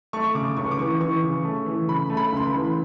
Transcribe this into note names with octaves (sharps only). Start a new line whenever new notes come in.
A3 C#6
C#3 D6
C#2 C#6
D6
E3 C#6
E3 C#6
C#3
A3
E3
C#3 B5
A3
B5
C#2 C6
B5
E3